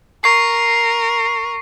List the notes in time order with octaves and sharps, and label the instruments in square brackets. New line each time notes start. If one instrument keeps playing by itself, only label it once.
[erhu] A#4 [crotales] C#6 C7